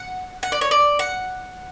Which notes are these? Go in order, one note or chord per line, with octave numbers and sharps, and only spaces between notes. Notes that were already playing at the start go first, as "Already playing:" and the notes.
Already playing: F#5
F#5
D5
C#5
D5
F#5